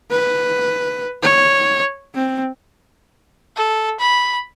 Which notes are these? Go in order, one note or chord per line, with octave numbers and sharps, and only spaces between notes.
B4
C#5
C4
A4
B5